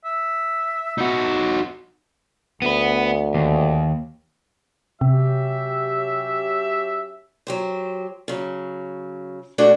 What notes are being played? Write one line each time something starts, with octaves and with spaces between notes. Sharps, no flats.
E5
D#4 F#4
D2 B3 B4
D#2
C3 F#3 C#4 G4 E5
F#3 G4 C5
C#3 F#3
B2 A3 D4 E4 F#4 G#4